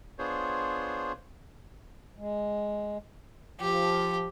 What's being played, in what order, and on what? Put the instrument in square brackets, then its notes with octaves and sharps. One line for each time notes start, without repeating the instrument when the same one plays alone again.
[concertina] B3 D4 F4 G#4 C5 C#5
[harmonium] G#3
[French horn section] F3 [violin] G4